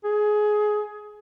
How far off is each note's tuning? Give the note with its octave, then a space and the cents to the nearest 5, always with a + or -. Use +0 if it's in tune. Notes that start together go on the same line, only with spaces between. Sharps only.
G#4 +20